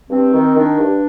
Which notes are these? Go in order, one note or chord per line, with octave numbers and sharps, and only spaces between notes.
G2 C4
D#3
D#3 D4
G2